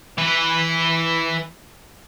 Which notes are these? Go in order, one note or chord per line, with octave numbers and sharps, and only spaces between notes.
E3 B4